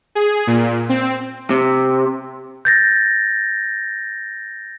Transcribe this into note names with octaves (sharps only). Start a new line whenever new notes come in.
G#4
A#2
C4
C3
G6 A6 A#6